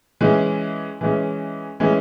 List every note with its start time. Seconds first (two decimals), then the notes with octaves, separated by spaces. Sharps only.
0.21 E3 G#3 C#4
1.01 E3 G#3 C#4
1.80 E3 G#3 C#4